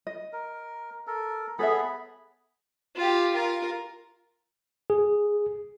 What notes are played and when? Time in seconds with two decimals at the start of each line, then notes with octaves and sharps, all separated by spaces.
0.07 D#5
0.33 A#4
1.07 A4 A#4
1.59 B3 G#4 A4 C#5 E5 B5
2.96 F4 G4
3.34 F4 A#4
4.90 G#4